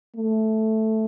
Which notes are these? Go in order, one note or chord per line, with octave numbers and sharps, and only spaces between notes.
A3